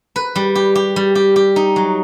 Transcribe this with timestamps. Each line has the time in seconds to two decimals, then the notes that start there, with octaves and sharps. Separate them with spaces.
0.16 B4
0.36 G3
0.55 G4
0.75 G4
0.96 G3
1.15 G4
1.36 G4
1.56 D#4
1.76 F#3